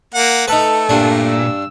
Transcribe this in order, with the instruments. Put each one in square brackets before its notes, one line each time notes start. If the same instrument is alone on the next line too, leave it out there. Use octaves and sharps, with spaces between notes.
[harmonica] A#3 F#5
[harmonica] A3 [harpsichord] D#4 B4 [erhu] A4
[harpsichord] G2 D4 [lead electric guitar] A#2
[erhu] E6